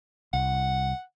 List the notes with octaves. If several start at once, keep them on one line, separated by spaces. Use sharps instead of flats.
C2 F#5